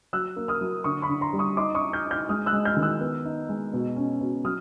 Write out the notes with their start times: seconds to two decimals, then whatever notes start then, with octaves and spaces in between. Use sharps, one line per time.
0.13 F#3 E6 F#6
0.36 A#3
0.48 D#6 F6
0.61 F#3
0.84 D3 C#6 D#6
1.02 B5 C#6
1.09 D3
1.21 A#5 C6
1.33 G3
1.39 C#6 D#6
1.57 D#4 C6 D6
1.75 C#6 D#6
1.81 D#4
1.93 F6 G6
2.05 D#4
2.11 F6 G6
2.29 G#3 D#6 F6
2.46 E6 F#6
2.53 G#3
2.65 F6 G6
2.77 D#3
2.83 E6 F#6
3.01 B3
3.25 D#4
3.49 G#3
3.73 B2
3.96 C#4
4.21 B2
4.45 F#3 D#6 F6